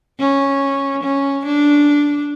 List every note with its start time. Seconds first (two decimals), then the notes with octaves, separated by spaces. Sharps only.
0.20 C#4
1.03 C#4
1.46 D4